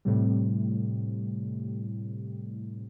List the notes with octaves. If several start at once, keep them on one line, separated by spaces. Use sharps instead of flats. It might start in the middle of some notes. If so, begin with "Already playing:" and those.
A2 C3 G3